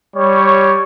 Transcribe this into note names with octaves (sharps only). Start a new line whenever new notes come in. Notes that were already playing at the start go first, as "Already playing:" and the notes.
G3 C#5